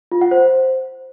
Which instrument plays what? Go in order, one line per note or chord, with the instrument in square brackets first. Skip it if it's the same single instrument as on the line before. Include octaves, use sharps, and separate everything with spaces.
[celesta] F4
F#5
C5